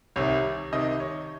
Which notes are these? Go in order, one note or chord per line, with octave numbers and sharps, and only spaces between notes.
C2 C3 D#3 C#5
C2 C3 D#3 D#5
C#5